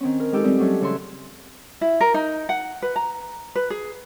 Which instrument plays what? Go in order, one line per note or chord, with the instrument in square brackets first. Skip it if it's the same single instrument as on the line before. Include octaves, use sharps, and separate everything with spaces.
[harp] D#3 C4 C#4
A#4
G#3 D#4 G4 A4
G3 C4 E4 F4 D#5
F#3 G3 A3 C#4
C#3 E3 C#5 E5 C6
[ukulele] E4
A#4
D#4
F#5
B4
A#5
B4
G#4